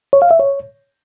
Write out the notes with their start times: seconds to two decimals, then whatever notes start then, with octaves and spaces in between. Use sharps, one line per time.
0.13 C#5
0.22 F5
0.31 E5
0.39 C#5